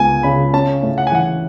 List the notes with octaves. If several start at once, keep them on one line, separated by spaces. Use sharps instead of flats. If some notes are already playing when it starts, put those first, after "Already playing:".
Already playing: C#2 B3 G#5
C#3 B5
C#4 A5
A2
F#5
G#5
E3 F#5